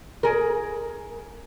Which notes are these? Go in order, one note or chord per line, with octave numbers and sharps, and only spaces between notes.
G#4 A#4